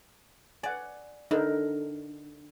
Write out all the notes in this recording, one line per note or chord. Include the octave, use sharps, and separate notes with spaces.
D5 F#5 G#5
D3 D#4 A#4